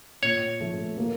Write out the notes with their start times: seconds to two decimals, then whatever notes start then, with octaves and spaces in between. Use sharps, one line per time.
0.22 A#2 C#5
0.60 F3 A3
0.98 A#3